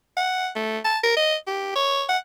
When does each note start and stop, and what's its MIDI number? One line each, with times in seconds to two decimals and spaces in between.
0.17 0.49 78
0.55 0.78 57
0.85 0.98 81
1.03 1.16 70
1.16 1.35 75
1.47 1.74 67
1.75 2.04 73
2.09 2.18 78